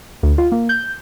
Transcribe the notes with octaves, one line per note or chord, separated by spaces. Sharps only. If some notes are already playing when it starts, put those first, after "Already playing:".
D2
F4
A#3
G6